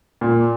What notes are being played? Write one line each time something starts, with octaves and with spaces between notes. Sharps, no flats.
A#2